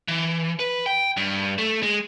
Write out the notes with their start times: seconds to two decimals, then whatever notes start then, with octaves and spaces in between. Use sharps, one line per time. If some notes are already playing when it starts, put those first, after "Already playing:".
0.08 E3
0.59 B4
0.86 G5
1.17 G2
1.58 A3
1.83 G#3